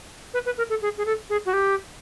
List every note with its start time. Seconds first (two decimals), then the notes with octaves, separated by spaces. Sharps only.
0.34 B4
0.46 B4
0.58 A#4
0.70 A4
0.82 G#4
0.98 G#4
1.06 A4
1.30 G#4
1.46 F#4
1.53 G4